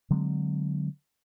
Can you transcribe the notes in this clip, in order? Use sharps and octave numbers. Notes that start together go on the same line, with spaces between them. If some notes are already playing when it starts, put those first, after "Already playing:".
D3 F#3 G#3 C4